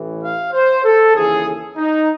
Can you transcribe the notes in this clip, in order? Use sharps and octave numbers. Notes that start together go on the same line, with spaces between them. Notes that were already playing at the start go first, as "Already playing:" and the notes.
Already playing: A1 A2 E3
F5
C5
A4
D#2 C#3 E3 G#4
D#4